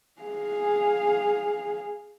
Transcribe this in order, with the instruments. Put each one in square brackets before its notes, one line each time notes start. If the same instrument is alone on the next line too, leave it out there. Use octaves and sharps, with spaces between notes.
[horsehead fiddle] G#4 F5